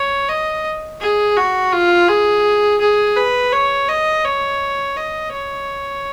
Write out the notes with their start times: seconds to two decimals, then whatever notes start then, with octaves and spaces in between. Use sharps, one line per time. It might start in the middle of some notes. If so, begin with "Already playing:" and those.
Already playing: C#5
0.28 D#5
1.01 G#4
1.37 F#4
1.72 F4
2.08 G#4
2.80 G#4
3.16 B4
3.53 C#5
3.88 D#5
4.25 C#5
4.97 D#5
5.32 C#5